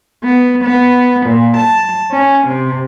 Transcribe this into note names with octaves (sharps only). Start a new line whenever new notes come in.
B3
B3
A#2
A5
C#4
C3